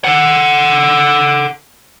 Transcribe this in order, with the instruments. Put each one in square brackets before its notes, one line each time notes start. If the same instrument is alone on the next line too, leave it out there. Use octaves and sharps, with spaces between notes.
[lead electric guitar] A4 F#5